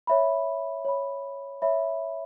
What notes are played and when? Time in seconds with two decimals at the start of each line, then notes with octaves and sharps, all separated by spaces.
0.07 C#5 E5 B5
0.85 C#5 E5 B5
1.62 C#5 E5 B5